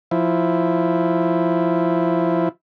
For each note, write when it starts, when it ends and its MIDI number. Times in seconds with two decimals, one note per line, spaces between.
0.11 2.49 53
0.11 2.49 64